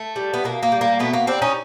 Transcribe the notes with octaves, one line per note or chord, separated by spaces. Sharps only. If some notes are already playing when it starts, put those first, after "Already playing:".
Already playing: A3
G3
B3
B2 A#3
A#3
G3
A#3
B2 A3 B3
A#3
G3 C4 D4
C#4 D#4